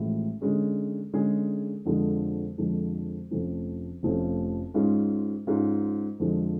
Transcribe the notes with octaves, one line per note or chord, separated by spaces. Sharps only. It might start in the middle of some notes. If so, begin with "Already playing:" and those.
Already playing: A1 A2 F3 G#3
D3 G#3 C#4 G#4
D3 G#3 C#4 G#4
F2 D3 F3 G#3
F2 D3 F3 G#3
F1 F2 F3 A3 C#4
F1 F2 F3 A3 C#4
G#2 G#3 C#4 F4
G#2 G#3 C#4 F4
F2 D3 F3 G#3